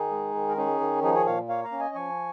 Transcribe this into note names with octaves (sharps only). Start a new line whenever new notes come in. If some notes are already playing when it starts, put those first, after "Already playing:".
Already playing: D#3 D#4 G#4
G#3
D#3
A#4
C#4 D#4 G#4
D#3
F3 D#4 G#4
G#4 C#5
A#2 C#5 F5
A#3 C#5 F5
F5 A#5
C#4
D#5 G#5
F3 G#5 C#6